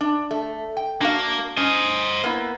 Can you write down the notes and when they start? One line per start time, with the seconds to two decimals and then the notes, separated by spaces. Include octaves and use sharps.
0.01 D4
0.31 A3
0.77 G5
1.01 A#3 D4 F#4 F5
1.57 C#4 C5 D#5
2.23 A#3 B3 E4